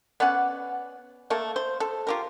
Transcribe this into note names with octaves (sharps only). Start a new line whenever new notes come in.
B3 C#4 D5 F#5
A3 A#3 A4
C5
A4
F4 G4 A#4